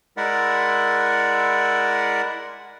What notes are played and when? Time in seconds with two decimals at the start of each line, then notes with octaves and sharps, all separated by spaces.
0.17 G#3 E4 A#4 D5 E5 F#5